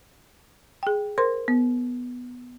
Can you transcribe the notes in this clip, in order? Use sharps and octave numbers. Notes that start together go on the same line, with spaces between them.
G#4 G5
A#4 C5 C6
B3